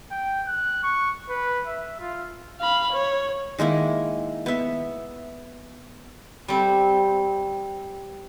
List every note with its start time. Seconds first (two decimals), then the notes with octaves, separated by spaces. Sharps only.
0.11 G5
0.47 F#6
0.83 C#6
1.29 B4
1.67 E5
2.00 F4
2.60 F5 B5
2.93 C#5
3.59 D#3 G#3 A#3 E4
4.46 B3 E5
6.48 G3 C4